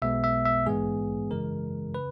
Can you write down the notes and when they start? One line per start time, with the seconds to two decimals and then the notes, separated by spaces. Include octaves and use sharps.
0.02 B1 B2 G#3 B3 E5
0.24 E5
0.45 E5
0.66 A#1 G#2 E3 G#3 B3 G#4
1.31 F#2 C#3 E3 G#3 A#4
1.95 C#3 B4